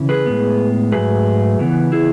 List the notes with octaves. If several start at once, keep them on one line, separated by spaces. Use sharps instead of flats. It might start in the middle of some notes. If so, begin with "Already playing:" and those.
Already playing: C#3 E3 C#4
G#4 B4
A2 G#3 B3
G#2 D#3 F#3 A3 G#4 B4
C#3 E3 B3
E4 G#4